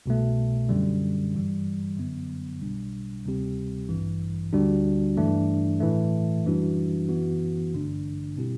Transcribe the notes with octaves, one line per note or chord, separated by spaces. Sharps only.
C2 B2 A3
F#2 D3 G3
G2 E3 G3
F#2 D3 F#3 B3
B1 B2 G3 D4
D2 C3 G3 C4 G4
A1 G2 E3
D2 D3 G3 D4 F#4
G2 E3 A3 D4
A2 E3 A3
F#2 E3 G3 D4 F#4
F#2 E3 B3 F#4
A1 G2 D3 A3 D4
B2 G3 C4 E4 G4